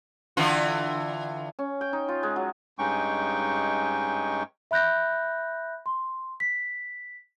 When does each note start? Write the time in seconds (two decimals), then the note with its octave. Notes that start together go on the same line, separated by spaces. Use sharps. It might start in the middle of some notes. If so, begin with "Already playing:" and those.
0.37 D3 E3 F4
1.59 C#4
1.81 G5
1.93 D#4
2.09 F4
2.23 G#3
2.36 F#3
2.79 G2 G#3 C#4 D#4 G5 C#6
4.71 E5 B5 F#6 G6 A#6
5.86 C6
6.40 B6